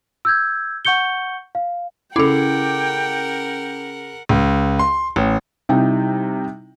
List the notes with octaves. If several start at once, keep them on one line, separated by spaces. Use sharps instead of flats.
E6 G6 G#6
F#5 C#6 G6 C#7 G7
F5
C#3 E4 A4 A#4 F#5 G5 D6
C#2
C6
A1
C3 G3 D#4 E4 G5